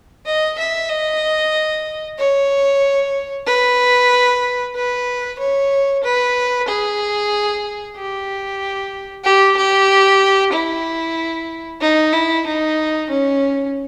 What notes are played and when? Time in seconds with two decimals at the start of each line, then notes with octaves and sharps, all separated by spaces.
0.26 D#5
0.58 E5
0.89 D#5
2.18 C#5
3.47 B4
4.75 B4
5.39 C#5
6.03 B4
6.68 G#4
7.96 G4
9.24 G4
9.57 G4
10.53 E4
11.81 D#4
12.13 E4
12.46 D#4
13.10 C#4